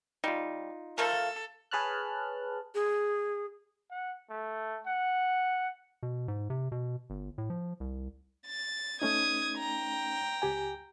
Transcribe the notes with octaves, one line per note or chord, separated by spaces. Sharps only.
G3 D#4 F4
F3 A3 A4 A#4 F5
G#4 B4 C#5 A5 F6 F#6
G#4
F#5
A3
F#5
B2
G#2
C3
B2
G1
A2
F3
C2
A6
A3 C#4 D#4 D#6 G#6
G5 A#5
C#2 G4 G#5